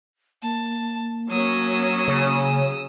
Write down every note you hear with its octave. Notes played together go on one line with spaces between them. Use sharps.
A#3 A5
F#3 A#3 C#4 D#6 E6
C#3